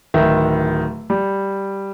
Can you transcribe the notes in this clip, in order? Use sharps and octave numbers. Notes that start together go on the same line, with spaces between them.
D1 D#3 B4 E5
G3